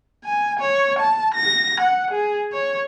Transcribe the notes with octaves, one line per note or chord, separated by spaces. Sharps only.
G#5
C#5
A5
A#6
F#5
G#4
C#5